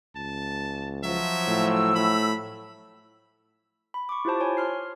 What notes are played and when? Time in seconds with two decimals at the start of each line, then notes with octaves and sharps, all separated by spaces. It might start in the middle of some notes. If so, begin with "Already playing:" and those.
0.16 C#2 A5
1.04 F3 F#3 E5
1.48 A2 E6
1.96 A2 B5
3.94 B5
4.09 C#6 D6
4.25 E4 F4 G4 C5 A5
4.40 C#5 G#5
4.57 C6 F6 C7